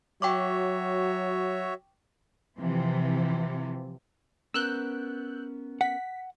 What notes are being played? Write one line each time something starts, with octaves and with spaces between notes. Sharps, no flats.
F#3 F#4 C#5 E5 G5 C#6 D6
C3 E3 F3
B3 C#4 A#4 E6 F#6 G6
F#5 B6